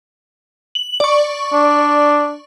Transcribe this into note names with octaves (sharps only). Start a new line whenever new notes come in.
F#7
D5 C#6
D4